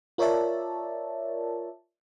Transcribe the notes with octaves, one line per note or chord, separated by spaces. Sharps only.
F4 A#4 C#5 D5 E5 A5